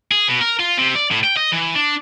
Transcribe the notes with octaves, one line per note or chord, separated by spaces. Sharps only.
G#4
B2
A#4
F4
C3
D5
A2
G5
D#5
E3
D4